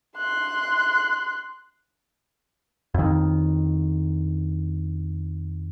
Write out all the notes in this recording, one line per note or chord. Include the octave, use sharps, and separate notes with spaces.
C6 F#6
F2 D#3